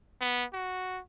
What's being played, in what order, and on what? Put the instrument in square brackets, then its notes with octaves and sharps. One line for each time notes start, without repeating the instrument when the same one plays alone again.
[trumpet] B3
F#4